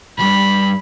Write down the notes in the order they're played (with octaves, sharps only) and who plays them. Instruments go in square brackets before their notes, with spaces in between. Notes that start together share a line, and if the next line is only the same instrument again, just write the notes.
[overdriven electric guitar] D2 G2 [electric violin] B5